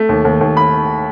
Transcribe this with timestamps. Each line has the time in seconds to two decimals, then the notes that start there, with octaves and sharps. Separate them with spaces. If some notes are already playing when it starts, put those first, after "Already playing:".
Already playing: A3
0.09 D#2
0.25 D#2
0.41 D#2
0.57 B5